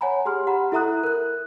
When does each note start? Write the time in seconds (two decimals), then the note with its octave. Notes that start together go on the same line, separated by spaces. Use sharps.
0.01 C#5 F#5 G#5 A#5 B5
0.25 G4 G#4 C6 F6
0.47 G4 F#5 A#5 B5
0.72 E4 A4 E5 A#5 D#6 F#6
1.03 A#4 F#6